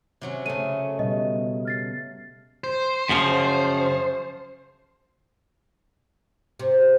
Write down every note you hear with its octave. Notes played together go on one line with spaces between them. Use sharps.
C3 F#3 C#4
C#3 A3 D#7
B2 G3 B4 D#5
F6 A6 C7
C5
F#2 C#3 F3
C3